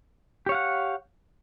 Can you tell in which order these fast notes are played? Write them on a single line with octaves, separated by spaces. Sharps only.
G4 C#5 F5 F#5